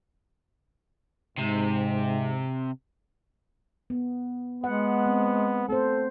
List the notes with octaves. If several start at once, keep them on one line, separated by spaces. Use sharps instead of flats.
G#2 C3
B3
G#3 B3 F#5
C4
A3 C4 A4 C5